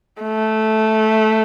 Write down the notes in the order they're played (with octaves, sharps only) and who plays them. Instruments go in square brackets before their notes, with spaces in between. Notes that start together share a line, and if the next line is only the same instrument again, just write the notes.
[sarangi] A3